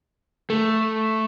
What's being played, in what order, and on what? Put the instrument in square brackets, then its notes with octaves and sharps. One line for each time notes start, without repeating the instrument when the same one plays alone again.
[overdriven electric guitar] A3